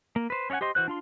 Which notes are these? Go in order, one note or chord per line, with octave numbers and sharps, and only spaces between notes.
A#3
B4 C5
C#4 C#5 D5 F#5 G#5
G4 C5 D#5 C6
E3 F#4 C5 F#6
D4 F4 C6